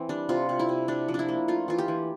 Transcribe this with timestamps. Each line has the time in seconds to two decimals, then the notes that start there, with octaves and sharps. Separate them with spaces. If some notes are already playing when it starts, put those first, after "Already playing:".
Already playing: E3 C4
0.09 G3 D4
0.29 C3 F4
0.49 C3
0.59 E4
0.69 C3
0.88 C3 D4
1.08 F3
1.14 D4 E4
1.28 A#3
1.48 A3 F4
1.68 E3 F4
1.78 G4
1.88 E3